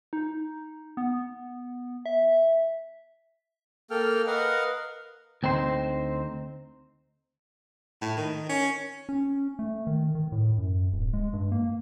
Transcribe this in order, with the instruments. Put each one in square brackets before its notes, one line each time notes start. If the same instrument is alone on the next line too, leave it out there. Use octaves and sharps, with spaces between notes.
[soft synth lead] D#4
B3
E5
[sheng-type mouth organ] A#3 A4 G5 F6
A#4 B4 D#5 F5 F#5
[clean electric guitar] D2 C4 D#4 C5
[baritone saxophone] A2
D#3
C#4
[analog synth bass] C#4
A3
D#3
D#3
A2
F#2
D1
G#3
G2
A#3